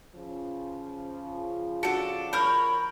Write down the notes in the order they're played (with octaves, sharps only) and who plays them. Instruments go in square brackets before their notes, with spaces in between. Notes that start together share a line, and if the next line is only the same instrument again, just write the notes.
[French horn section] C#3 F3
[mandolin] D4 A4 [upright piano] F#4 C#7
[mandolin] A#4 C#5 [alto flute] B5 [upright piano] F6 G6